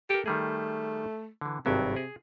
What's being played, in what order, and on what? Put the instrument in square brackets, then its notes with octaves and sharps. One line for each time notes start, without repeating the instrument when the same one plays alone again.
[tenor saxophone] G4 [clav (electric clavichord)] A4 A#4
[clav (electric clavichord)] D#3 G3 G#4 [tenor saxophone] A3
[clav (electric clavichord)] D3 E3
[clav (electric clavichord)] G#1 G2 F#3 [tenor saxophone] C3
[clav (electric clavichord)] G#4